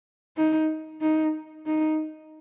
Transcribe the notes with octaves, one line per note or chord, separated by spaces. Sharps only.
D#4
D#4
D#4